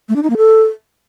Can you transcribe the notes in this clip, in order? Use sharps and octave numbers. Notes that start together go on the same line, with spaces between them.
A3
D4
D#4
A#3
A4